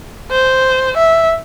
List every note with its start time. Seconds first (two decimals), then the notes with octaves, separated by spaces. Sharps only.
0.31 C5
0.98 E5